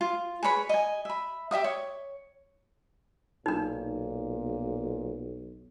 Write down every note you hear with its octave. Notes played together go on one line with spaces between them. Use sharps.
F4
G#4 B4 C#5 B5
D#5 G#5
E5 B5
G4 E5 F5 D#6
C#5
B1 A#2 D4 D#4